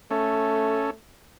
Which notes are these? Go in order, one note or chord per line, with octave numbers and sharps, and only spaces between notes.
A3 C#4 A4